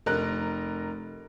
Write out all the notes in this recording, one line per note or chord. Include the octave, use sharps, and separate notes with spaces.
F1 A#4 F#6